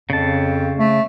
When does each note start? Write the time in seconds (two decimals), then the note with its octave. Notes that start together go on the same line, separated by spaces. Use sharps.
0.10 F2 C#3 A5
0.78 A3